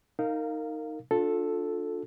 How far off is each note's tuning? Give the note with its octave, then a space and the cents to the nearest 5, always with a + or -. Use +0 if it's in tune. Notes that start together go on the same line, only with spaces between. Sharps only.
D#4 +0 A#4 -25 F5 +0
D4 +0 F4 +35 A4 +0